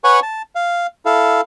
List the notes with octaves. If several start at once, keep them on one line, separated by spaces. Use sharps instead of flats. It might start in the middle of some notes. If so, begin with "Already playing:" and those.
B4 C#5 F#5 G#5 C#6
A5
F5
E4 A4 F5